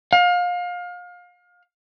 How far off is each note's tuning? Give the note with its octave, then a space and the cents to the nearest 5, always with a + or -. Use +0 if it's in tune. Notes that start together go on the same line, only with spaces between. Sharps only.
F5 +30